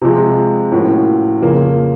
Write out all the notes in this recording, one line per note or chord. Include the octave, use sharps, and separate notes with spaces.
C3 F3 G#3
A2 F3 A#3 C#4 F#4
F2 C#3 F3 A#3